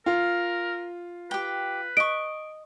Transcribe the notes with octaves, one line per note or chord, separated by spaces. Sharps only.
F4 A#4
G4 B4 G5
D#5 C#6 D7